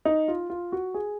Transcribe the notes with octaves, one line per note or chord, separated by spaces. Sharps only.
D#4
F4
F4
F#4
G#4